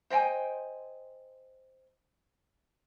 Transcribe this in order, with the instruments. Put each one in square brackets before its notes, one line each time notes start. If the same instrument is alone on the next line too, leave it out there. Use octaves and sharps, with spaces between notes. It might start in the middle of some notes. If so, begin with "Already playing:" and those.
[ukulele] C5 D#5 G5 G#5